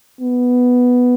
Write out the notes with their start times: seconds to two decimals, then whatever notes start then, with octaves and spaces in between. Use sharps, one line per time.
0.21 B3